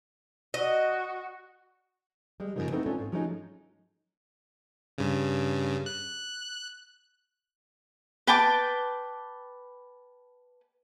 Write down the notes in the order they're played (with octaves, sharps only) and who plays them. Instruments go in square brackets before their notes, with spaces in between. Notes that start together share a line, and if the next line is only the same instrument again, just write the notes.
[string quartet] F#4 [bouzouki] D#5
[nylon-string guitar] G3 G#3
F#2 A#2 C#3 F3 A#3 D#4
A3 B3 C4 D#4 E4 A4
C#4 D4 F4 A4
G#2
F3 F#3 G#3 A3 C#4 D#4
[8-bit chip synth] G2 C#3
F#6
[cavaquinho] B4 G5 A5 D6